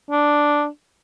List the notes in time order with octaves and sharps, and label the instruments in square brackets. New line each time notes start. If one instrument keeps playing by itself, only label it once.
[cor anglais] D4